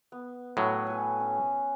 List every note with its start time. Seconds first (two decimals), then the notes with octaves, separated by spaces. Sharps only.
0.12 B3
0.57 A2 F#3
0.87 B4 G#5
1.20 C#4